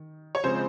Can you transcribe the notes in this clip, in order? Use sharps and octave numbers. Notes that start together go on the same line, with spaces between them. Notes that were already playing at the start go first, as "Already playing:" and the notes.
Already playing: D#3
C#5
C#3 F3 G#3 C4 C5